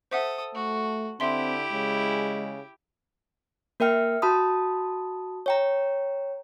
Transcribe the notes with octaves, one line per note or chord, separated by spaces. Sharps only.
A4 C5 E5 F#5 D#6
A3 F#4
D3 C4 E4 G4 E5 C6
C#3 G#3
A#3 A#4 E5 G5 F6
F#4 A5 B5 D#6
C#5 G5 A#5